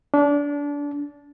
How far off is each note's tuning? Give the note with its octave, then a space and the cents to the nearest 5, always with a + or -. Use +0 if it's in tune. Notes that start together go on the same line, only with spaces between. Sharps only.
D4 -25